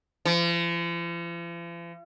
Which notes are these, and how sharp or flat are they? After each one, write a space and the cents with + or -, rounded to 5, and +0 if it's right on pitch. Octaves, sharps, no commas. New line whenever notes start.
F3 -45